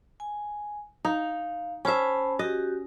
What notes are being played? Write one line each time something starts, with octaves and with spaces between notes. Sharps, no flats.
G#5
D#4 F5
C#4 C5 E5 A5 B5
F#4 G4 D#5